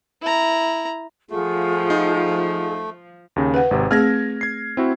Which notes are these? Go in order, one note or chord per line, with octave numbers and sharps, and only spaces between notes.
E4 A#5
F3 A3 F4 G#4 F#5
D#4
D#2 C#3
B4 F#5
G#1 C3
A3 C4 G#4 F6 G#6 A#6
G#6 C7
C4 E4 F#4